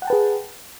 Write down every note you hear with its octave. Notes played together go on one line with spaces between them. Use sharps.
G#4 B4 F#5 G5 A5